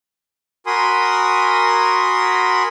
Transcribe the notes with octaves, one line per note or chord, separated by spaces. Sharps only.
F#4 A#4 G#5 B5 C6 D#6